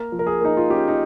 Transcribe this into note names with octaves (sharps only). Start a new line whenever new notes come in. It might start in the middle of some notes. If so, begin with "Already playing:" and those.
Already playing: A#3 A#4
F3
A#4
G#4
A#3 D#4
F4
C#4 G4
D#4